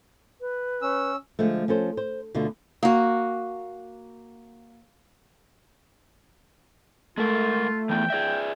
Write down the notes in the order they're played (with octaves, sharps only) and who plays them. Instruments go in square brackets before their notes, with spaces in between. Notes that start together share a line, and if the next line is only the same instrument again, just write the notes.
[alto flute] B4
[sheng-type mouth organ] C#4 E6
[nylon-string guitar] D3 F3 G#3 A3
F3 C#4 A4 C5
C5
D2 B2 D3 F4
[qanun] A#3 F#4
[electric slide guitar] G#3 A#4 [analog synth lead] A3 [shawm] F4
[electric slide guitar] E3 F3 B3 [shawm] G5
[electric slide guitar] G#4 D5 E5